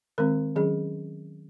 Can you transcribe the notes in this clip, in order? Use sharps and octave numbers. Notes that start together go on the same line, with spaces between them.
D#3 G#3 C4 A#4
D#3 F#3 C#4 G#4